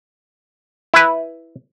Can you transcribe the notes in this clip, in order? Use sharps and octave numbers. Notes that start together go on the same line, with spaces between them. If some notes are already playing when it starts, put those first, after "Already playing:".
E4 B4